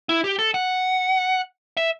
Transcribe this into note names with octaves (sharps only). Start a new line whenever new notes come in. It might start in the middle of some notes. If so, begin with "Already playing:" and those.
E4
G4
A4
F#5
E5